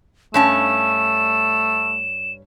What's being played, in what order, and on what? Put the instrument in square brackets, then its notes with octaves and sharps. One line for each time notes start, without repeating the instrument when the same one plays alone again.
[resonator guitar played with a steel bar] G2 C#4 A5 [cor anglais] A3 [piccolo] E7